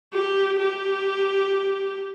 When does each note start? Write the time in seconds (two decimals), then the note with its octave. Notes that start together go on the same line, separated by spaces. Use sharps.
0.13 G4
0.60 G4